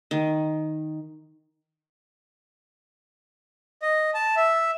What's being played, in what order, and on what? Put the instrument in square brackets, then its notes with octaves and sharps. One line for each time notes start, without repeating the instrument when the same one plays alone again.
[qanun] D#3
[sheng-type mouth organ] D#5
A5
E5